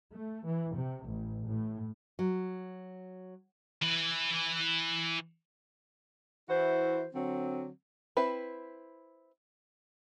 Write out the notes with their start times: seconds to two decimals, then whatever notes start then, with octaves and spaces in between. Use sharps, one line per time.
0.12 A3
0.45 E3
0.76 C3
1.05 A1
1.47 A2
2.19 F#3
3.82 E3 B4
6.49 E3 E4 F#4 C5
7.14 D3 F#3 C4
8.17 C4 E4 B4